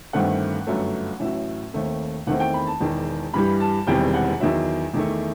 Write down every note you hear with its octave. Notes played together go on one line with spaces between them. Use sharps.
G1 G2 D#3 A3 C4 F#5
G1 F#2 F#3 A3
A1 A2 F#3 E5
D#2 D#3 A3 C4
E2 D#3 A3 C4 F#5
G5
B5
A5
E1 E2 D#3
G2 E3 G3 B5
A5
E1 E2 C3 D#3 G3 G5
F#5
E2 D#3 F#3 E5
E2 D#3 A3